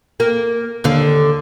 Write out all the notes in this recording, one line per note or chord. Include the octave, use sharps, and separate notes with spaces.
A#3
D#2 D3 F5